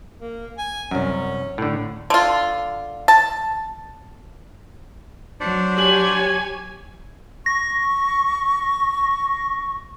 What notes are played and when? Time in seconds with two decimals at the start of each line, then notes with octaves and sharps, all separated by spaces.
0.22 A#3
0.58 G#5
0.91 C2 F#2 C#4
1.58 A2 D3
2.10 D3 F4
3.08 A5
5.40 F#3 D4 C5 D5
5.78 G4 C#5 G#5 F#7
6.14 G#6
7.46 C#6 A#6